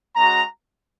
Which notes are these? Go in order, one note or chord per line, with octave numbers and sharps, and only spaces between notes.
G#3 C#4 F#4 A#5